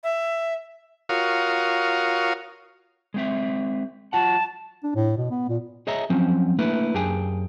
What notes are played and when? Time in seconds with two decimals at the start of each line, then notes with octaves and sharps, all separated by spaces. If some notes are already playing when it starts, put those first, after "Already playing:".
0.04 E5
1.09 F4 F#4 A#4 C#5 F5 D#6
3.14 G#3 C4 E5
4.13 F#3 F4 F#5 A5
4.83 D4
4.95 A2
5.18 B2
5.31 B3
5.49 A#2
5.87 G#4 C#5 D#5 E5 A#5
6.10 F3 F#3 C4 C#4
6.59 A3 A#3 D4 E4 B4
6.94 F#2 D4 G4 G#4 G5 G#5